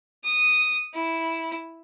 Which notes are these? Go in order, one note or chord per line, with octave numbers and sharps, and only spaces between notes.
D#6
E4